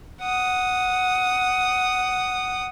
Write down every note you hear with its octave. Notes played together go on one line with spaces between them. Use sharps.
F#5 D#6